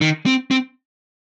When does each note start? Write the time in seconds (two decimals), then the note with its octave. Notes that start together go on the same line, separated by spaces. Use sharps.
0.01 D#3
0.26 C4
0.51 C4